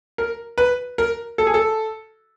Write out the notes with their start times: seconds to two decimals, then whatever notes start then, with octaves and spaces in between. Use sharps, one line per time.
0.18 A#4
0.58 B4
0.98 A#4
1.38 A4
1.47 G#4
1.54 A4